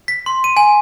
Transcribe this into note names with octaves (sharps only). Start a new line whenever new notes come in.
B6
C6
D#7
G#5